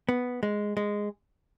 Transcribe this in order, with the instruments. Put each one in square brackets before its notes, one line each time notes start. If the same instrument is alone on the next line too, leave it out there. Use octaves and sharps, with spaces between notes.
[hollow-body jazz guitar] B3
G#3
G#3